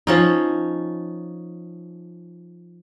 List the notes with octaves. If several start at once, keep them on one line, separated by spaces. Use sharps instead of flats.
F3 C#4 D#4